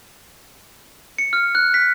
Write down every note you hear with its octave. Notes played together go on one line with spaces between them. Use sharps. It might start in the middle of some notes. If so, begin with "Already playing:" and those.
C#7
F6
F#6
B6